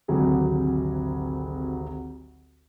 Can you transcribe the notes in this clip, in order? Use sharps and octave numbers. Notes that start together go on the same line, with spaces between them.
G#1 D2 C3 F#3 G3 G#4